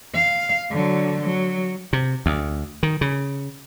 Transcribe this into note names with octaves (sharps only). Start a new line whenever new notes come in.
F5
D3 F#3
F#3
C3
D2
D#3
C#3